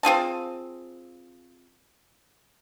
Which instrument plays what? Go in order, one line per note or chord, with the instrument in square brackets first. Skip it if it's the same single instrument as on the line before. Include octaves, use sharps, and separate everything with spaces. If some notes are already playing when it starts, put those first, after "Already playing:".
[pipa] C4 F4 G#4 A5